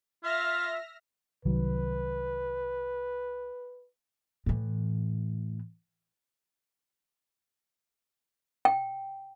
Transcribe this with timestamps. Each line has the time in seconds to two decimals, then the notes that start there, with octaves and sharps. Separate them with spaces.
0.24 F4 E5 F6 A#6
1.45 C2 D#3 F#3 B4
4.46 A2 E3
8.65 G5